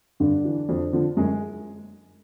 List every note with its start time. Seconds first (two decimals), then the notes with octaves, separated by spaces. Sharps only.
0.20 G2 D3 D4
0.45 E3
0.69 F2
0.93 D3 F3
1.17 F#2 G#3 G#4